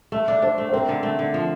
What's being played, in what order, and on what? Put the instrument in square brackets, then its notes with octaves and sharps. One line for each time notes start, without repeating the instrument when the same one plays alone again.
[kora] A3 [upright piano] E5
[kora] D4
[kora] D4 [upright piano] C5
[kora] A3
[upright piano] C5
[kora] C4 [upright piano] A#4
[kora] D3
A3
D3
F3